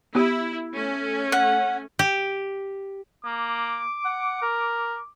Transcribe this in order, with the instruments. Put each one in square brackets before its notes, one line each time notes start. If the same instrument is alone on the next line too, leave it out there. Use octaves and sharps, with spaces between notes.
[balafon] B3 G4 [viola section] E4
[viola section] A3 C#4
[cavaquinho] F#5
[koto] G4
[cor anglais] A#3 [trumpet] D6
[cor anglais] F#5
A#4